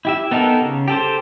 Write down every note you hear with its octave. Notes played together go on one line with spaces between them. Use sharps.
E4 G4 E5
B3 D#4 G4 A4 A#4
C#3
G4 A4 C5